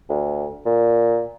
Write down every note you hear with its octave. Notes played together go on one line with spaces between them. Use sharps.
D2
A#2